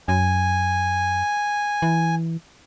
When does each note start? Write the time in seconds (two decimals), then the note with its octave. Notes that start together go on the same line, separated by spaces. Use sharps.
0.08 F#2 G#5
1.82 E3